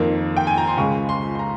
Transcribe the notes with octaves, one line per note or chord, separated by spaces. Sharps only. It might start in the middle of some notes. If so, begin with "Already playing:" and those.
Already playing: F2 D#3 A#3
G5
G#5
A#5
C6
C#2 C#3 G#3 C#6
C6
C6
A#5